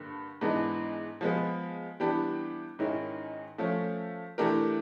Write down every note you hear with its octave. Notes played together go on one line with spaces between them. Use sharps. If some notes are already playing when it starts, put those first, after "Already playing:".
Already playing: G2 D3 A#3
G#2 E3 G#3 B3 D4
F3 G#3 B3
E3 G3 B3 D4 G4
G#2 D#3 G#3 C#4 E4
F3 A3 C#4
E3 A3 D4 G4 A#4